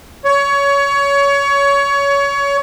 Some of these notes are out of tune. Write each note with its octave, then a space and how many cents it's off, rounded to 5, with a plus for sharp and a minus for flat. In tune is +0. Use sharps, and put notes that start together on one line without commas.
C#5 +20